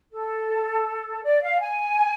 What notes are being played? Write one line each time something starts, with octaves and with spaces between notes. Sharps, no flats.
A4
D5
F5
G#5